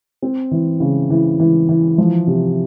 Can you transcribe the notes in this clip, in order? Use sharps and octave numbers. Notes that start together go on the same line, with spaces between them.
C4
E3
C#3
E3
E3
E3
F3
C3